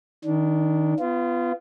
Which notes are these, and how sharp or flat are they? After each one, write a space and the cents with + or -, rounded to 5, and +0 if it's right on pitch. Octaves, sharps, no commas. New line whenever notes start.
D#3 +10 D4 -15
B3 +20 F4 -25